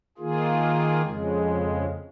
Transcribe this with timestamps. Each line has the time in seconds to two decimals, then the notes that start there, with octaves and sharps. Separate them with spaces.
0.18 D#3 A#3 F4 G#4
1.02 F2 C#3 G#3